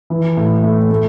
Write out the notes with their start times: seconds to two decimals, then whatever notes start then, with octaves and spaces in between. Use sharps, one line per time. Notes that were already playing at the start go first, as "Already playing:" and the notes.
0.10 E3
0.37 A2
0.63 A3
0.90 A3